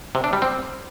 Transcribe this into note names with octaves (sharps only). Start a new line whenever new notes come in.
C3
D4
G3
C4